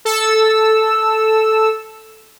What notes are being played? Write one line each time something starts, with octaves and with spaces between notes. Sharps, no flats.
A4 E6